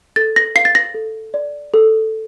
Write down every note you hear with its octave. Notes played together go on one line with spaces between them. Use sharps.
A4 A6
A#6
F5 C7
A6
A#6
A4
D5
A4